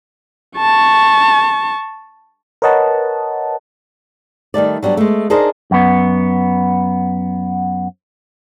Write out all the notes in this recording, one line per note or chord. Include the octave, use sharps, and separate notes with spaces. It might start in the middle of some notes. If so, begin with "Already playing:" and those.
A5 C#6
A#4 B4 C#5 D#5 F#5 A5
D#3 G3 A3 D5
F#3 G3 B3 D4
G#3 A3
D4 D#4 G#4 A#4 C5 D#5
F#2 B3